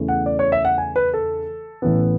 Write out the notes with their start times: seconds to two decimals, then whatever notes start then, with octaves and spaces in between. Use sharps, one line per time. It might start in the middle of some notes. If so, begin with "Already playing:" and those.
Already playing: E2 C#3 E3 A3
0.08 F#5
0.26 D5
0.39 C#5
0.52 E5
0.65 F#5
0.78 G#5
0.96 B4
1.14 A4
1.82 A1 A2 E3 B3